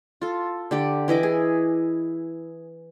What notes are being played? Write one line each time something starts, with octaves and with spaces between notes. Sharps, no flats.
F4 A4
D3 G4 D5
E3 E4 D#5 D6
G#4